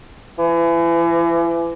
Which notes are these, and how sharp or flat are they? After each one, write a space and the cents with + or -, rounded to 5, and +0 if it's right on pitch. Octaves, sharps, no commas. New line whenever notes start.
E3 +35